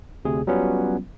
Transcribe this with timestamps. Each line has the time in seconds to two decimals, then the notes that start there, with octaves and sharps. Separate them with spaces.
0.25 D2 C3 G#4
0.47 F#3 G3 B3 C#4 F4